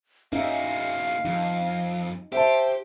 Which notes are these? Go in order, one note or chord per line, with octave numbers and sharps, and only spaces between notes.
A#3 C#4 D#4 F#4 E5 F5
F2 D#4
G4 C5 E5 A5